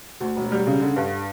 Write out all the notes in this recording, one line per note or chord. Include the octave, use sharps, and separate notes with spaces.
D2
E1
G3
C#3
D3
G2